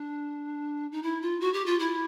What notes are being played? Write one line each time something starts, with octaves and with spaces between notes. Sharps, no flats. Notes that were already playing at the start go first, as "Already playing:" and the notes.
Already playing: D4
D#4
E4
F4
F#4
G4
F4
E4